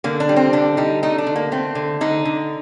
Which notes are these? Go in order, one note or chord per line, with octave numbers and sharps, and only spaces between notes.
D3 A#3
D4
G3
C4
D3 D4
G3 D#4
A3 D#4
D4
D3
A#3
A3 C4
D3
D3 D#4
D3